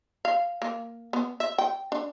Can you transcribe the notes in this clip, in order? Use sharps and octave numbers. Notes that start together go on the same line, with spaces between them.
F5
A#3
B3
E5
G5
D4